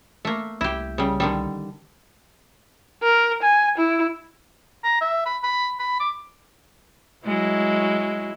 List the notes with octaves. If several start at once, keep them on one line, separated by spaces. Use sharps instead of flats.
A3 A#3
C2 E4 G4
C#3 G3
D3 D#3 G3
A#4
G#5
E4
A#5
E5
B5
B5
B5
D6
F#3 G#3 E4